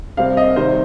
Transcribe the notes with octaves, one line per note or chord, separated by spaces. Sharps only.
C3 G3 C4 F5
D#5
C3 D#3 G3 C5